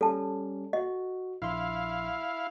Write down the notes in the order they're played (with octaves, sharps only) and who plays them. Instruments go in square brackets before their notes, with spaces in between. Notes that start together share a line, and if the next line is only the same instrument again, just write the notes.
[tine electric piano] G3 C#4 [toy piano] A4 A5
[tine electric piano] F#4 [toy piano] D#5
[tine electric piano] A#1 C6 [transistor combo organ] E4 F5